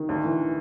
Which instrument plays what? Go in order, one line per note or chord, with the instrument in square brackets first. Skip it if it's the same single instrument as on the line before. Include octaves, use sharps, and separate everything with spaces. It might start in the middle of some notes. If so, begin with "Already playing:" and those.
Already playing: [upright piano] D#3
D2
E3